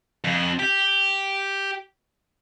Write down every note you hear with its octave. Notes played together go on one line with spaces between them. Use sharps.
F2
G4